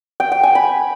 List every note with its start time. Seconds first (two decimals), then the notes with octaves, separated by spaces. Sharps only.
0.20 G5
0.32 G5
0.43 G#5
0.55 B5